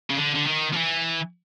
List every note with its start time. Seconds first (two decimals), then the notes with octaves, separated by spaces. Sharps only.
0.10 C#3
0.16 D3
0.35 D3
0.46 D#3
0.73 F3
0.76 E3